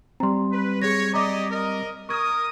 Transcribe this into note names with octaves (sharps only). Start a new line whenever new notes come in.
G3 C4 A#5 C6
B4
G#4 C#5 A#6
G4 D5 D#5 A#5 D6
A#4 D#5
A#4 C#6 D#6 G#6